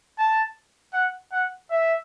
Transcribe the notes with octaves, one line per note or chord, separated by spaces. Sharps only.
A5
F#5
F#5
E5